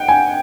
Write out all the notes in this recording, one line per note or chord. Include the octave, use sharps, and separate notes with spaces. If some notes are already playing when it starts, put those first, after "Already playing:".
Already playing: F#5 G5
G#5